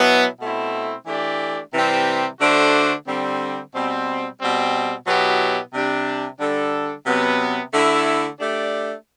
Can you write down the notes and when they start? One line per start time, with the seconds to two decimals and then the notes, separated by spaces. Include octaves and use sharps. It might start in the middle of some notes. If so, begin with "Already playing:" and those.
Already playing: B2 F#3 B3 E4
0.40 B2 A3 C4 E4
1.06 E3 A3 D4 G4 D5
1.73 C3 E3 G3 C4 G4
2.40 D3 A3 D4 F#4 C5
3.06 D3 G3 C4
3.73 B2 G3 C4
4.40 B2 G3 C4
5.06 B2 F#3 B3 E4 G4
5.73 C3 G3 D4 G4
6.39 D3 G3 D4 A4
7.06 C3 F#3 B3
7.73 D3 A3 E4
8.39 A3 D4 G4 D5